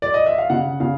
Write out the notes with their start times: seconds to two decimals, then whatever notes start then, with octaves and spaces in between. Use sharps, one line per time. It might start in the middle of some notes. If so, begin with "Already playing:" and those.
0.02 D5
0.14 D#5
0.26 E5
0.38 F5
0.50 C#3 F#5
0.80 C#3 F5